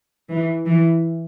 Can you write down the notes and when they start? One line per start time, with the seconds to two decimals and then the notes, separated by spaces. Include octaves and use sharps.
0.30 E3
0.66 E3